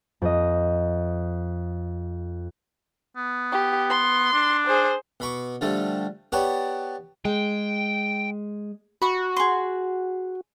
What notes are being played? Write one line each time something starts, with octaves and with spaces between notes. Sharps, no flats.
F2 D#5
B3
G4
C6
D4
G#4 C5
B2 B5 C#6 D6
D3 F3 G3 A3
B3 G4 B4 C#5 D5 A5
G#3 G5
F#4 B5 C#6
G#4 C6